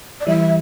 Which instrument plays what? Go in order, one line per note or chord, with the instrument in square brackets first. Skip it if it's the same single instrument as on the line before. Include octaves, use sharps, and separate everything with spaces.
[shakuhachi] D5
[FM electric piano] E3 G3 [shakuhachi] E5